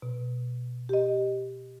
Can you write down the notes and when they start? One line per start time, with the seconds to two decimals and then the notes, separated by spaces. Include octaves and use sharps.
0.02 B2
0.89 G4 D#5